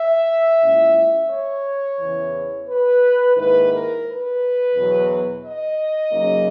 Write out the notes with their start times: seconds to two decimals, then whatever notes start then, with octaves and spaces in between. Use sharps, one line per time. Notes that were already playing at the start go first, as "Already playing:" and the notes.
Already playing: E5
0.62 A#2 G#3 C#4 E4
1.31 C#5
2.00 E2 C#3 E3
2.68 B4
3.37 G#2 D#3 A#3 E4 B4
3.71 A#4
4.05 B4
4.74 E2 B2 F#3
5.43 D#5
6.11 F#2 C#3 F#3 A#3 D#4